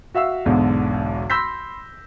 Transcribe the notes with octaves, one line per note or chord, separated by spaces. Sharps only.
F#4 E5 F5 E6
B1 E2 G#2 B2 D3
B5 C6 E6 G6 A#6 B6